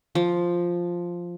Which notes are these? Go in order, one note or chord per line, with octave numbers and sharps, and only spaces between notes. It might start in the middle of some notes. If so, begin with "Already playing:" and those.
F3